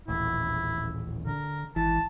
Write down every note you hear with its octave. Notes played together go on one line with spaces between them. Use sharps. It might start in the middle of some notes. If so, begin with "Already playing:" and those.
D#1 A1 E4
D3 A#4
G#1 E3 A5